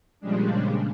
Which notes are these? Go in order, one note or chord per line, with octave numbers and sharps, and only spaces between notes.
A#2 C#3 F3 G3 G#3 D4